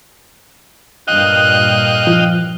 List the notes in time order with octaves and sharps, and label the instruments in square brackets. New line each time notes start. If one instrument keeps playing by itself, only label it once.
[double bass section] G2 A#2 [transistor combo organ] D#5 F5 G5 [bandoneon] F#6
[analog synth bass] F3